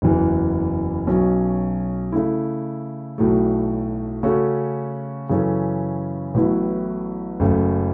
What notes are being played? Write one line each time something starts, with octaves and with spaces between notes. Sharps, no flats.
F#1 E2 E3
B1 B2 F#3 C#4
C#3 A3 E4
B1 A2 F#3 A3
C#3 A3 C#4 F#4 A4
F#2 C#3 E3 C#4 A4
A1 A2 F#3 B3 E4
F#1 F#2 C#3 A3